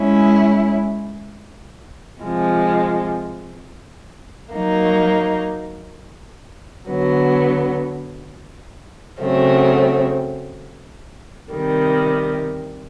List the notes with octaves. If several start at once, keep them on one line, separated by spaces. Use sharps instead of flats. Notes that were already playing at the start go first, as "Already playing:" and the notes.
Already playing: G#3 C#4 E4
C3 F3 G#3
F#3 A#3 D#4
D3 F#3 B3
C#3 F#3 A3 C4
C3 D#3 G3